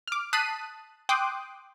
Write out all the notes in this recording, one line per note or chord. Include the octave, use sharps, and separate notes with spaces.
D6 F6
A5 D#6 F#6 B6 C7 D#7
G5 C6 D6 D#6 F#6